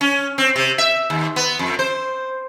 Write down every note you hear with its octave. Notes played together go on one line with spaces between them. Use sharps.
C#4
C4
C3
E5
D#2
B3
F2
C5